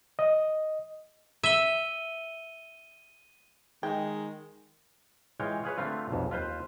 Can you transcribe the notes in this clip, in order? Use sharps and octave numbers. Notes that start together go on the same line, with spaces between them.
D#5
E5 D#7 G7
D#3 G#3 G5
E3 G#3 F4 C#5 G5
F4 G#4 B4 C#5
D3 A3 C4 F4 B4
B1 F2
D#2 F4 B4 C5